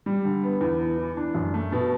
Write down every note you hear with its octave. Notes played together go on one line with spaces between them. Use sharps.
G3
D3
B3
E2
B3
E3
D4
F#2
A3
B2